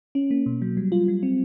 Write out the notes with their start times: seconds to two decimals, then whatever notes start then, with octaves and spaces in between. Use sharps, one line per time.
0.15 C#4
0.31 A#3
0.46 B2
0.62 F#3
0.77 G3
0.92 F4
1.08 G3
1.23 C4